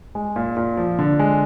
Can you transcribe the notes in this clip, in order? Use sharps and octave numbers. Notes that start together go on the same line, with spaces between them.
G#3
A#2
A#2
F3
D3
G#3